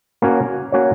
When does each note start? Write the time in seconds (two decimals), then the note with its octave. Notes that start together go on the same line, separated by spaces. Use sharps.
0.22 A#3 C#4 F#4 C#5
0.72 A#3 C#4 F#4 C#5